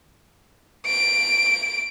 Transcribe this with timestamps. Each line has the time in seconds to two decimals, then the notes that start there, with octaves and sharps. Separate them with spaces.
0.86 D7